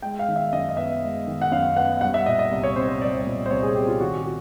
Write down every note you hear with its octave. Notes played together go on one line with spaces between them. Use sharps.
G#3 G5
F5
D#3
E5
F#2 D#5
D#5
B3 E5
G#3
D#3
F#5
F#2 F5
B3 F#5
G3 F#5
E5
A#2 D#5
D#5
C2
C#5
C4 C5
C5
G3 D5
A#2
C5
C2 C#5
G#4
C4 G4
F4
D#3 F#4
F#4